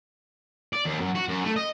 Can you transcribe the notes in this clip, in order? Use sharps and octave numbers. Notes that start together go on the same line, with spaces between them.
D5
D#2
F#2
F#4
F#2
A3
D#5